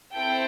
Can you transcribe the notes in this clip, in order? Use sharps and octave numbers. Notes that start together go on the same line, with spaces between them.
C4 E4 A4 G5